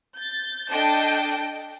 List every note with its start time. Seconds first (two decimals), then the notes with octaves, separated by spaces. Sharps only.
0.16 G6 A6
0.69 D4 A4 D#5 G5 A5 G6